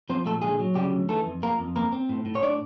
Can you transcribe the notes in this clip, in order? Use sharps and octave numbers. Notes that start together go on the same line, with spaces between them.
F3 C4 C5
A#2 A3 A4
D3 G#3 G#4
F#3
C#3 G3 G4
D2
E3 A3 A4
F2
F3 A#3 A#4
F2
A#3 C4 A#4
C4
A2
A2
C#5
D4 D5